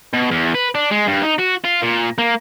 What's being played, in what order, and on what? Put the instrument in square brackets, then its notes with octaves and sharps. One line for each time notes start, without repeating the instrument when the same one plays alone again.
[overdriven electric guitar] B2
E2
B4
D4
G#3
G2
D#4
F#4
F4
A#2
A#3